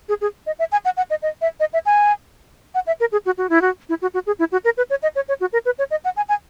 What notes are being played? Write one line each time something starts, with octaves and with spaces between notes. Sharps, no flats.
G#4
G#4
D#5
E5
G#5
F#5
F#5
D#5
D#5
E5
D#5
E5
G#5
F#5
E5
A#4
G#4
F#4
F#4
E4
F#4
E4
F#4
F#4
G#4
E4
F#4
A#4
B4
C#5
D#5
C#5
C#5
F#4
A#4
B4
C#5
D#5
F#5
G#5
G#5